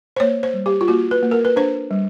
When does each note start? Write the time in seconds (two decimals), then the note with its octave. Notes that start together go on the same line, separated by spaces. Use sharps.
0.16 C5
0.20 A#3 C#5
0.43 C5
0.54 G3
0.66 G4
0.81 F4
0.88 A#3 F#4
1.11 B4
1.23 A#3
1.31 A#4
1.45 B4
1.56 D4 C5
1.91 G3